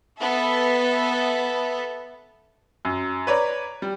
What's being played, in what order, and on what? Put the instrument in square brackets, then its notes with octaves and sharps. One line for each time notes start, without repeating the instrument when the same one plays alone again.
[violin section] B3 A4 E5
[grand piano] F#2
B4 C#5 D5 A#5
G3